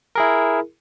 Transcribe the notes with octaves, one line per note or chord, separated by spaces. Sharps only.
E4 G#4 A#4